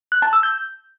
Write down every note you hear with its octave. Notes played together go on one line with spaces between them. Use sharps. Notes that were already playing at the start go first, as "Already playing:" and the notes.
F#6
A5
E6
G6